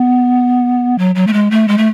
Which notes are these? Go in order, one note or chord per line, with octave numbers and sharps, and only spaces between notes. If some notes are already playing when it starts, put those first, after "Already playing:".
Already playing: B3
F#3
F#3
A3
G#3
A3
G#3
A3